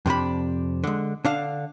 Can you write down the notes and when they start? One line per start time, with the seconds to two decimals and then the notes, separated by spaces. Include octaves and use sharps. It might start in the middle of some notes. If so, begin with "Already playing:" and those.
0.06 F2 C3 D4 B5
0.84 D3 G#3
1.25 D3 D4 F5